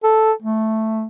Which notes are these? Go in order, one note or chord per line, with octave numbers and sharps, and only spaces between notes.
A4
A3